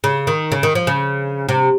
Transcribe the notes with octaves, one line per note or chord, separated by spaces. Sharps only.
C#3
D#3
C#3
D#3
F3
C#3
C3